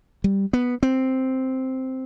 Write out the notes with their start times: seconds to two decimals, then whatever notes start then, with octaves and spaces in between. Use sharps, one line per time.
0.24 G3
0.53 B3
0.83 C4